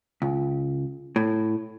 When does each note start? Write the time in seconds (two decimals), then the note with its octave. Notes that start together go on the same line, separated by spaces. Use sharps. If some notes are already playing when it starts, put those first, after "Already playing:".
0.22 C#2
1.16 A2